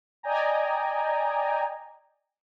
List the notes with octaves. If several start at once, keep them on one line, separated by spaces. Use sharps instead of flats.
D5 D#5 G5 G#5 A#5